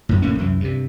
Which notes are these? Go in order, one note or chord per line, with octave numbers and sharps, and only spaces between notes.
F#2 A2
F1 A2 A#3 C#4
C2 F#2 E3
G2 C3